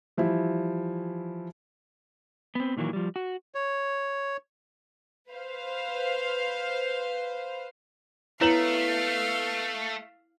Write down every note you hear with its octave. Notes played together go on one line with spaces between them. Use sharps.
E3 F3 G3 E4
B3 C4
A#2 D#3 E3 F#3 A#3
F3 G3
F#4
C#5
B4 C5 F5
A3 B3 E4 C#5 F5 E7 F#7